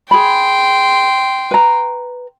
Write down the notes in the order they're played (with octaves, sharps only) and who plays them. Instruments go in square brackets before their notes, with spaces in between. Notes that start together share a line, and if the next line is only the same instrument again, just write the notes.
[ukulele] G#4 B5 [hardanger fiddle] G5 C6
[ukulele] B4 A#5